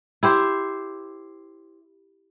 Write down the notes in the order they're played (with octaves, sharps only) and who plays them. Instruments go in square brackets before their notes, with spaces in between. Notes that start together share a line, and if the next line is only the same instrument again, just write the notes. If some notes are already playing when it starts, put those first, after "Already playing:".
[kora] E4 G4 C5